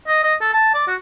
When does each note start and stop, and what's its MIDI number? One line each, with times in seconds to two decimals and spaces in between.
0.07 0.23 75
0.24 0.34 75
0.41 0.50 69
0.53 0.71 81
0.74 0.86 74
0.87 0.95 66